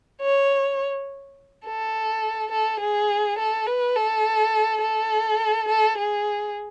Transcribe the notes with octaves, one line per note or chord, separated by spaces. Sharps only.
C#5
A4
A4
G#4
A4
B4
A4
A4
A4
G#4